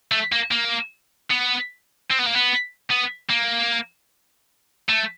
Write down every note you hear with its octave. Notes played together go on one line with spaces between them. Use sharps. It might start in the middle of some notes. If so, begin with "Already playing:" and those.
A3
A#3
A#3
B3
C4
B3
A#3
B3
B3
A#3
A3